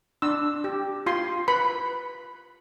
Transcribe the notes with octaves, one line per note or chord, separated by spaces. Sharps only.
D4 E6
G4
F4 C6
B4 B5